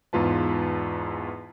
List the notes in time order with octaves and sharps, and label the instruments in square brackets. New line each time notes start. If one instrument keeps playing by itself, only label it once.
[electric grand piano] E2 G#2 F4 B4 A5